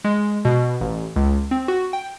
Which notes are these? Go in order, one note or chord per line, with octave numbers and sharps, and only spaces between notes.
G#3
B2
A1
C#2
C4
F#4
G5